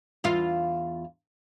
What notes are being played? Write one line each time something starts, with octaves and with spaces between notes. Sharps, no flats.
E2 F4